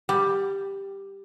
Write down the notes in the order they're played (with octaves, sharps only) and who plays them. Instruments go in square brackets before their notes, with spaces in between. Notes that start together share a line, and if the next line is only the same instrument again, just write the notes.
[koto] G3